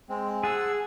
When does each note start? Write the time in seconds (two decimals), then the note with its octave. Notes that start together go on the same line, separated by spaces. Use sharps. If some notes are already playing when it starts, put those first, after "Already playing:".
0.09 G#3 C4
0.43 G#4 F#5 A5 E6